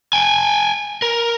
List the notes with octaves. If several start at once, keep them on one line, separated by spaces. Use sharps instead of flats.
G5 G#5
A#4